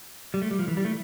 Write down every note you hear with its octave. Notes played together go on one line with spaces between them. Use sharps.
G3
A3
G3
F3
E3
G3
A3